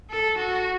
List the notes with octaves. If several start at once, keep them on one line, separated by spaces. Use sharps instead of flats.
A4
F#4